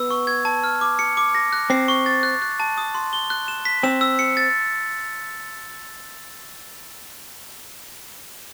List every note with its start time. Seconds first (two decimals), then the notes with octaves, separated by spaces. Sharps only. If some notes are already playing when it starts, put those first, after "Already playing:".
Already playing: B3 E6
0.11 C#6
0.27 G#6
0.45 A5
0.64 F6
0.81 D6
0.99 C#7
1.17 D6
1.35 A#6
1.53 F#6
1.70 C4 C7
1.88 C#6
2.06 A6
2.23 F#6
2.42 F#6
2.60 A5
2.78 D#6
2.95 C6
3.13 G7
3.30 F#6
3.48 E7
3.65 B6
3.83 C4 E7
4.01 E6
4.19 C#7
4.37 A6